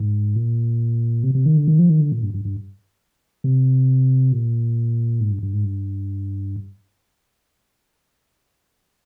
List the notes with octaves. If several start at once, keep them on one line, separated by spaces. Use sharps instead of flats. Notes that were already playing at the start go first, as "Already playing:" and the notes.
Already playing: G#2
A#2
C3
C3
D#3
D3
D#3
F3
D#3
D3
A#2
G2
G2
G2
C3
A#2
G#2
G2
G2
G#2
G2